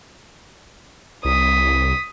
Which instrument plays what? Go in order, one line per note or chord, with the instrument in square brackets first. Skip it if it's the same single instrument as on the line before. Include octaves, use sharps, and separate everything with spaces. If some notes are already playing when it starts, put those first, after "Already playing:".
[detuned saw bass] C2 [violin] D#6 B6